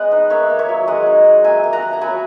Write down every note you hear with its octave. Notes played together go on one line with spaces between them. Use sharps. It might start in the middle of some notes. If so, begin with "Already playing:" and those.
Already playing: G#3 B3 D#5 F#5
D#4
A#3 C#5 E5
A#3
C#5 E5
F#3
G#3 D#5 F#5
D#4
D#4
A#3 E5 G#5
A#3
F#5 A#5
A#3
A#5
F#3 G#5 B5